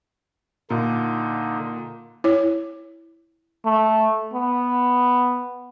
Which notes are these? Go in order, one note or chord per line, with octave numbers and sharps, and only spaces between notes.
A#2 D3 D#4
E4 C#5
A3
B3